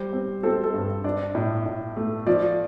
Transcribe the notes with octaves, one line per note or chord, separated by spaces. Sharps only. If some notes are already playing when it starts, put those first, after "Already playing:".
Already playing: G3 C5
C4
C4 A4
A4
G2
D4 D5
A2
A2
A3
F3 D5